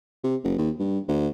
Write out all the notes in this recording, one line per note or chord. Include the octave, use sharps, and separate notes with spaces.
C3
F#1
D#2
G2
D2